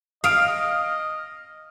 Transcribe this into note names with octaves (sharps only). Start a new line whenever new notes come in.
D#5 F5 D#6 F6 D7